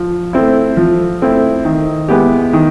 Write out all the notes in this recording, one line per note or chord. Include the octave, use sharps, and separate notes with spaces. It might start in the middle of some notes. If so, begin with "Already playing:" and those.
Already playing: F3
A3 C4 E4
F3
A3 C4 E4
D#3
G#3 B3 E4 G4
D#3